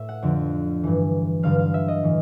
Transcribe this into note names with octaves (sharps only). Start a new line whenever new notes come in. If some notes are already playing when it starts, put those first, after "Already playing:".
Already playing: A2 E5
F#5
F2 D3 F3
G2 E3
G2 D3 F#3 F5
F5
E5
D#5
A2 E3